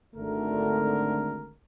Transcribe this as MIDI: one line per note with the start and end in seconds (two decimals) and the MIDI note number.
0.15 1.52 32
0.15 1.52 50
0.15 1.52 57
0.15 1.52 70